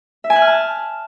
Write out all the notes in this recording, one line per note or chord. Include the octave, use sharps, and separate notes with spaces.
E5
G#5
F#6
F6
A5